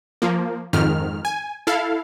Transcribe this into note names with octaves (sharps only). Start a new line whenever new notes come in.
F3 A#3
F2 G#2 D#3 F6
G#5
E4 A4 F5